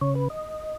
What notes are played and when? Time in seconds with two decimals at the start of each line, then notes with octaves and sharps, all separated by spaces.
0.01 C#3 C#5
0.15 B4
0.30 D#5